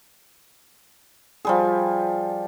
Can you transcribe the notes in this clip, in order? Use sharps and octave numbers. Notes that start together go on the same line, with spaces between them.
F3 G3 G#4